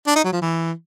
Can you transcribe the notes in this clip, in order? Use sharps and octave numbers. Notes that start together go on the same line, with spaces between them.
D4
D#4
F#3
F3
E3